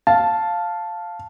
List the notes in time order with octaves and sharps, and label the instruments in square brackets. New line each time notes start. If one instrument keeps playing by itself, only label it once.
[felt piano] F5 [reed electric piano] A5